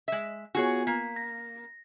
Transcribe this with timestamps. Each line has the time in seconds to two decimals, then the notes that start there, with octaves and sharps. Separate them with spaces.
0.08 G#3 E5
0.55 B3 F4 F#4 G#4 C#5 G#5
0.87 A#3 B6
1.16 A#6